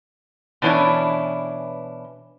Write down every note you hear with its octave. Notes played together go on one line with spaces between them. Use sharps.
B2 E3 C#4 D4 E4